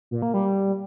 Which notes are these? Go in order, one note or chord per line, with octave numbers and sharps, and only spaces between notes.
A#2
A#3
G3